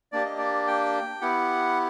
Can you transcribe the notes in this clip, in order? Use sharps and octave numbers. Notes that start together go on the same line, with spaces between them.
A#3 D4 G4 D5
D#5
D5
G5
B3 E4 G4 F#5